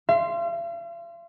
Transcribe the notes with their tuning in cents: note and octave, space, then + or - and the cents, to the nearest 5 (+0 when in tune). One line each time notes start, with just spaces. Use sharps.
F5 -45 C6 +0